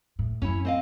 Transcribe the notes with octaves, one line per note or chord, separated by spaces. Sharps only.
A2
F#2 C#4 E4
C4 D#5 F5